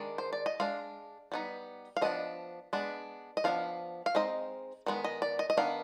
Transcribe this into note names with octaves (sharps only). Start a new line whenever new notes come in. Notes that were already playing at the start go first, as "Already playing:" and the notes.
Already playing: D#3 G#3 D4
C5
D5
D#5
G#3 D4 F5
G3 B3 D#4
F5
F3 B3 D4 D#5
G#3 B3 D4
D#5
F3 B3 D4 F5
F5
G#3 C4 D#4 D#5
D#3 G#3 B3
D#5
D5
D#5
D#5
D#3 B3 D4 F5